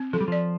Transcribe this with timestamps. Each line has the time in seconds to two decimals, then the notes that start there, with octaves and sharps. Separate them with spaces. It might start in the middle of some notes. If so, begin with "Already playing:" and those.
Already playing: C4
0.13 F3 A4
0.21 G3
0.28 F3 D5